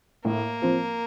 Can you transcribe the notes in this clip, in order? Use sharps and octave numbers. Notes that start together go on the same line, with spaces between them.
A2 A#3
F3 C4